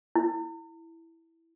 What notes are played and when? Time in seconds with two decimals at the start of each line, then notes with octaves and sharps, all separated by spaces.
0.16 E4